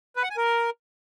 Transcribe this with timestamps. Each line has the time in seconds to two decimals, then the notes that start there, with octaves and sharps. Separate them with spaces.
0.16 B4
0.23 F#5
0.30 G#5
0.37 A#4